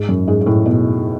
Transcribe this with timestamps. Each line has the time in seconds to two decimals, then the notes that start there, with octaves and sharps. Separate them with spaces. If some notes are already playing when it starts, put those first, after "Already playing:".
Already playing: G#2
0.09 F#2
0.28 G#2
0.41 G#2
0.46 A2
0.66 B2